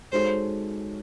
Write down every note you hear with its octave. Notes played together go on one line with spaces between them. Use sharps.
G#3 D#4 F#4 A4 C5 C#5